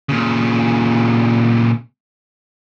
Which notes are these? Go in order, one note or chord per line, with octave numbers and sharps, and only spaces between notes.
A#2 C#3